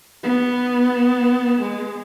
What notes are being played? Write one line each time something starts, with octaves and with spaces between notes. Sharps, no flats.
B3
G#3